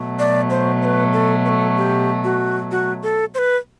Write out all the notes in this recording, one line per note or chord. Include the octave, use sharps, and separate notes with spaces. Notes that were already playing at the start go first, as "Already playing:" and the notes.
Already playing: B2 F#3 A3
D5
C5
C5
B4
A4
B4
A4
G4
F#4
F#4
A4
C5
B4